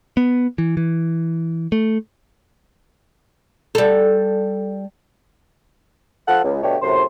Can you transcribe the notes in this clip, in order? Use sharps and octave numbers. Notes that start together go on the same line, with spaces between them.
B3
E3
E3
A3
G3 A4
F3 A4 F5 F#5
C#2
B2 D3 A3 D4 G4 C#5
F#2 A2 C3 C5 C6